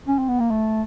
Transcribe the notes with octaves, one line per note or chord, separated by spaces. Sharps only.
C#4
C4
B3
A#3
A3